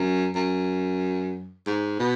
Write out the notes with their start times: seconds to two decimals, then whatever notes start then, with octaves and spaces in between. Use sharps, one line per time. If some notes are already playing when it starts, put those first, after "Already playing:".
Already playing: F#2
0.35 F#2
1.67 G#2
1.99 B2